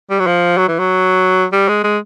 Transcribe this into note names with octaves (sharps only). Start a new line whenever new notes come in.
G3
F#3
F3
F#3
E3
F#3
G3
G#3
G#3